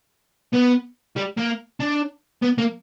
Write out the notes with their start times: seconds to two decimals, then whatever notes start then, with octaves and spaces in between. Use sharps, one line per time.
0.53 B3
1.16 G3
1.37 A#3
1.80 D4
2.43 B3
2.58 A#3